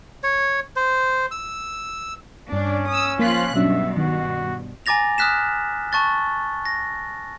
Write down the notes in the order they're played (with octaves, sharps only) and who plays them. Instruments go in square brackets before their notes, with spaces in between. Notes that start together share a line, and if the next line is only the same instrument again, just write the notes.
[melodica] C#5
C5
E6
[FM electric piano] G2 [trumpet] C#4 [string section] D4
[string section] D#6 E6
[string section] F3 F4 F#6 [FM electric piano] A#3 B6
[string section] G2 B2 [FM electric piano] F#3 C#4 D4 [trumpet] E5
[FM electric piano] D#3 [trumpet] F#4
[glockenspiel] G#5 A#5 D6 A6 A#6 F7
D#6 F6 F#6 B6 E7
A5 C#6 F#6 A6 G7
A#6